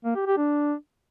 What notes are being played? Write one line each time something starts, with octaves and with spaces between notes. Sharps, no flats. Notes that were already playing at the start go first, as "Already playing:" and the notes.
A#3
G4
G4
D4